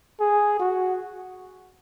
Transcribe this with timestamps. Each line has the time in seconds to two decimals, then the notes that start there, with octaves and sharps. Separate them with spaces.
0.20 G#4
0.60 F#4